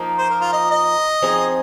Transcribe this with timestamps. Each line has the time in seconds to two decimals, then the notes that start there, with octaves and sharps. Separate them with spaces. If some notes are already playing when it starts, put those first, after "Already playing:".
Already playing: F3 A#3 D#4
0.18 C5
0.30 A#4
0.41 F4
0.53 D#5
0.71 D#5
1.22 F3 C4 D#4 G#4